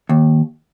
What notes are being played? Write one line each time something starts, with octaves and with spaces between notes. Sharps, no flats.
D#2